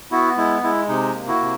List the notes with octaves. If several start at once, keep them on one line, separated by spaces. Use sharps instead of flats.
B3 E4 F#4
G#3 E4
G#3 E4
C3 D#4
A#3
E4 F#4
C3